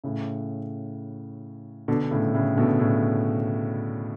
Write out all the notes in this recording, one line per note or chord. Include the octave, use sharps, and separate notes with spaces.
A2 C#3
B2 D3
A2 C#3
A2 C#3
B2 D3
A2 C#3